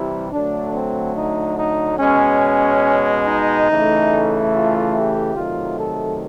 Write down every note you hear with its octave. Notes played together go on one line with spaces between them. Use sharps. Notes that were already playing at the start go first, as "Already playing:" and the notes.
Already playing: C3 E3 G3 E4
D3 F#3 A3 D4
C4
D#4
D#4
B2 G#3 C#4
D#4
C#3 E3 A3
F4
G4
C3 D#3 F#3 A3 F4
A4